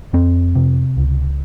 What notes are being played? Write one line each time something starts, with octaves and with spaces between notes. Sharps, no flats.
F2 C4
C3
C#2